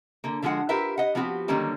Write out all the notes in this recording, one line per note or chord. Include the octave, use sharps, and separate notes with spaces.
D3 A#3
D3 F3 G#3 F#4 F#5
F4 G4 A#4 B4 E5
D#5 F#5
F3 B3 C4 F#4 G4
D3 D#3 F#3 G3 A#3 C#4